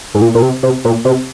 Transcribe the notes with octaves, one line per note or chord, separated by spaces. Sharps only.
G#2
A#2
A#2
C3
C3
A#2
C3